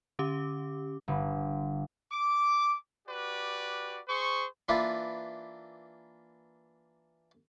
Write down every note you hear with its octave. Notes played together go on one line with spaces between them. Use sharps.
D3 C#4 G4 D6
G1
D6
F#4 G4 B4 D5
G#4 C5 C#6
E3 A#3 D4 E4 F4 B4